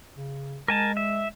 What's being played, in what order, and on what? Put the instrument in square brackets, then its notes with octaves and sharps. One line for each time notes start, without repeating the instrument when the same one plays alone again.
[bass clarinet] C#3
[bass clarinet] G#3 [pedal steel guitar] A#4 G#5 A5
[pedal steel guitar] E5